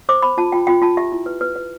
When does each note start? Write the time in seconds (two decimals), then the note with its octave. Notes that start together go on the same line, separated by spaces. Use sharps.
0.09 C5 D6
0.22 C5 B5
0.38 F4 A5
0.52 F4 G5
0.67 F4 G5
0.82 F4 A5
0.97 G4 E5
1.12 E4
1.26 B4
1.41 B4
1.56 B4